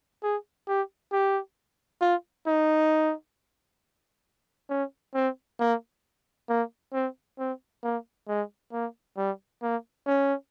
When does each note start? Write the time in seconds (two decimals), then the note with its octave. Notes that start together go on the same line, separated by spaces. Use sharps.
0.23 G#4
0.68 G4
1.12 G4
2.01 F4
2.47 D#4
4.70 C#4
5.15 C4
5.60 A#3
6.49 A#3
6.93 C4
7.39 C4
7.84 A#3
8.28 G#3
8.72 A#3
9.17 G3
9.63 A#3
10.07 C#4